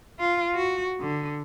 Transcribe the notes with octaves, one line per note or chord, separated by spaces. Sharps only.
F4
F#4
D3